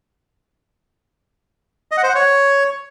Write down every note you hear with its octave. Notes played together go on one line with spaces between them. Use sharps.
D#5
F#5
C5
F#5
C#5